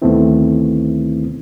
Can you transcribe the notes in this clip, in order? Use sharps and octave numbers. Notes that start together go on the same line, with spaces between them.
D2 D#3 A3 B3 C4 E4